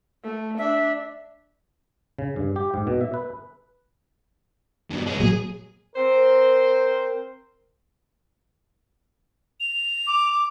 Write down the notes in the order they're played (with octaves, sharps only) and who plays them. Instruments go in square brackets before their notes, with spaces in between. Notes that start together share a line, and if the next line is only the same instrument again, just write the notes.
[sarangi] A3
[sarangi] D4 [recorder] E5
[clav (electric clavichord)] C#3
G2
G4
G#2
B2
E5
B4
[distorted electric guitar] G2 B2
G#3 C#4
[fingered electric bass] A#2 F#3 [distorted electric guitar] G#4
[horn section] C4 A#4 C5
[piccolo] F7
[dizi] D6